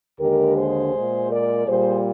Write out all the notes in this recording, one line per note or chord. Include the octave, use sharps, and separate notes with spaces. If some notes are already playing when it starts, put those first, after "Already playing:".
D#2 D3 G#3 G4 A#4
G#4 C5
A#2 G#3
A#4 D5
A#2 G3 G#4 C5